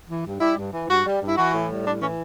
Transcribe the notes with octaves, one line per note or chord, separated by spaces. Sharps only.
E3
G2
G3 E4
G2
E3
G2 F#4
G3
G2
E4
E3 F#4
A2
G3
A2 D4
E3 C#4